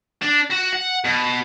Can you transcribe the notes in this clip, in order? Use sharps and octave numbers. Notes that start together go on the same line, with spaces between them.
D4
F#4
F#5
B2